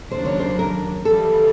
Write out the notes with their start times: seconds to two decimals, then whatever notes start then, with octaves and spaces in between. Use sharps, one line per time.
0.11 D#2 C#3 F#3 A#3 D4 C5
0.25 C#5
0.39 C5
0.59 A#4
1.05 C#3 E3 G3 A4